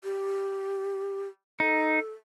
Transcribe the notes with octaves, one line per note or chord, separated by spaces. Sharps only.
G4
D#4 A4